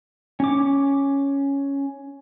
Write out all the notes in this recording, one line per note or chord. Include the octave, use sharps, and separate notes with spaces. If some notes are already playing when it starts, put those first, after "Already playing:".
C#4 D6